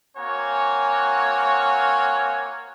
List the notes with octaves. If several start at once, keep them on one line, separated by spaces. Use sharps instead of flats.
A#3 C4 F#4 C#5 G#5